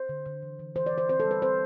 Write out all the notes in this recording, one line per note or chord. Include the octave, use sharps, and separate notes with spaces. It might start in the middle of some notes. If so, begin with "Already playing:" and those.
Already playing: C5
D3
D3
E3
E3
E3 C5
D5
E3
C5
C4 C5
A4
G3
B4
C4 C5